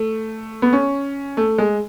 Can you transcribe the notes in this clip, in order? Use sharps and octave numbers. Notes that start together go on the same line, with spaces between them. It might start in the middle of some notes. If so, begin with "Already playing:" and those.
Already playing: A3
B3
C#4
A3
G#3